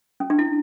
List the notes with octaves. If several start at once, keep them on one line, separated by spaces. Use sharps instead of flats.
C#4
D4
E4